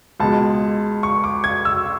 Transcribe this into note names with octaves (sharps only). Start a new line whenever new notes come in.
C#2 B2 G#3 A5
C#6
D6
G#6
E6